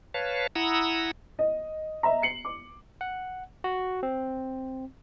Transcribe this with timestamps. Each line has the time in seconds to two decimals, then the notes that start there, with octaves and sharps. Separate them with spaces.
0.14 B4 C#5 F5 A5
0.56 E4 F#5 A#5 D#6 E6
1.39 D#5
2.03 D#5 E5 A#5
2.22 C7 C#7 F#7
2.45 D6
3.01 F#5
3.64 F#4
4.03 C4